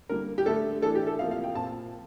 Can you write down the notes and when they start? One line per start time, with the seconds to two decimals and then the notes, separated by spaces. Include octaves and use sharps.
0.09 D3 G3 A#3 A#4
0.38 G4
0.46 D3 A3 D4 A4
0.82 E3 A3 D4 A4
0.95 G4
1.07 A4
1.19 C3 F3 A#3 F5
1.31 F5
1.44 G5
1.55 A#2 F3 C4 A5